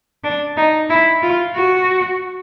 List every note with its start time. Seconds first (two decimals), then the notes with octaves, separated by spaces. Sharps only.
0.24 D4
0.57 D#4
0.90 E4
1.23 F4
1.55 F#4